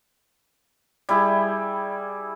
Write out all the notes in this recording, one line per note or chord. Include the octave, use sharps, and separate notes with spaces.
G3 E4 G#4